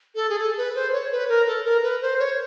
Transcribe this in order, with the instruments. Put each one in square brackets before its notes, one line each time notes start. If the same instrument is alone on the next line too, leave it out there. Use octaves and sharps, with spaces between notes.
[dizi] A4
G#4
A4
B4
C5
C#5
B4
A#4
A4
A#4
B4
C5
C#5